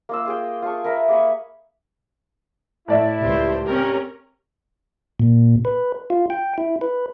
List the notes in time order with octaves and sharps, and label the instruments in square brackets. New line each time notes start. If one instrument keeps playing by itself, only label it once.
[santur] A#3 F4 E6
F4 G#4 G5
F4 G#4 A5 C#6
A#4 B4 E5 A#5
A#3 G#4 B5 C#6
[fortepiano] A2 D5 E5 [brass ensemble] E4
[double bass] C#2 [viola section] G4 C5
[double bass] C4 [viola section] C#4 G4 A#4
[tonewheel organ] A#2
B4
F4
G5
E4
B4